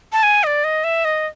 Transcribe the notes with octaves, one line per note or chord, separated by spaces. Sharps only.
A5
G#5
D#5
D5
D#5
E5
D#5